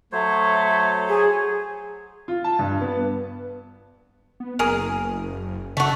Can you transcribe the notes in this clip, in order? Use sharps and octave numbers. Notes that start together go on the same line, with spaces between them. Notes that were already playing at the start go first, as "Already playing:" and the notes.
F#3 A3 C5 C#5
G#4
F4
A5
G2
B3
B3
F#1 G#4 A#4
C#3 A3 F#4